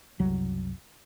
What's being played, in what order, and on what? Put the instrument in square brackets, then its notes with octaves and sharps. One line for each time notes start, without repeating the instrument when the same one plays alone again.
[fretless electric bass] F#1 C2 F#3